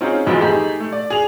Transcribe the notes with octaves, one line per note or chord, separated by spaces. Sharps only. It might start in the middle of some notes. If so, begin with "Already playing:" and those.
C4 C#4 D#4 F4 G#4
F2 G#2 B2 E3 F3 G#3
A3 D#4 G4 G#4
A3
D5
G#4 F7